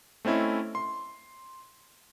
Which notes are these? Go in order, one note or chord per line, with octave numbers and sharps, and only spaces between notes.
A3 C4 C#4 E4 D#5
C6